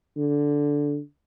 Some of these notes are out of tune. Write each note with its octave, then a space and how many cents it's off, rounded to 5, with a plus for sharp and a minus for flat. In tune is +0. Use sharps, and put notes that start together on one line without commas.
D3 -10